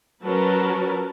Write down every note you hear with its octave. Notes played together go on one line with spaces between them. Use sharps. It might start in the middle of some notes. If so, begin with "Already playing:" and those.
F#3 C#4 A#4 B4 A5